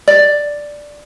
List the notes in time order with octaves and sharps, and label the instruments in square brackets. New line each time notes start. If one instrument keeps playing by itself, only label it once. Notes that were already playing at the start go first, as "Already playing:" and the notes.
[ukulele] D5